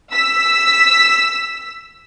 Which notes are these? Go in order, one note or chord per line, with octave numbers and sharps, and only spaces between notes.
E6 B6